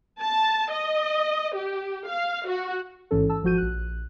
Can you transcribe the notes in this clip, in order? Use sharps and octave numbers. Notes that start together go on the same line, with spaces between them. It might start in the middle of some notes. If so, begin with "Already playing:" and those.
A5
D#5
G4
F5
F#4
A1 G#2 E3 C#4 A4
A5 E6
G#1 F3 F#4 G6 D#7
A#1 F#6